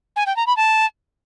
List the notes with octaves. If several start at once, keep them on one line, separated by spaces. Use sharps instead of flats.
G#5
G5
A#5
B5
A5